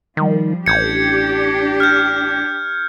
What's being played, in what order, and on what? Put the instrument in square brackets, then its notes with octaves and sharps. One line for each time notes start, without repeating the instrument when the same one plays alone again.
[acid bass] D#3 [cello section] F3 G3
[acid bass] A1 [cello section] D4 G4 [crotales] G6 G#6 C#7
[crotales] F6 G6